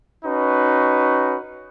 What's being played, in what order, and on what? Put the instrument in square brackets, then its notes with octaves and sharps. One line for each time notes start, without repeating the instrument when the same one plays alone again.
[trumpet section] C#4 D#4 F#4 B4